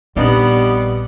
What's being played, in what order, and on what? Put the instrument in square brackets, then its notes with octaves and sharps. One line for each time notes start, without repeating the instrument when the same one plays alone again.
[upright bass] A#1 [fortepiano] C3 D4 D#4 [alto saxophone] G3 [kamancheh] B3 B4